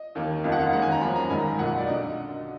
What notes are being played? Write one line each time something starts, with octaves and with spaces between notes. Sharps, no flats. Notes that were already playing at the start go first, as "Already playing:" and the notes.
Already playing: D#5
D#2 D#3 A#3
F#1 F2 D#3 A#3 F5
F#5
F5
D#2 D#3 G#3 F#5
G#5
A#5
F#2 F3 A#3 B5
A#5
A#1 G#2 D#3 G#3 G#5
B1 A#2 F#3 A#3 F#5
D5
D3 D#5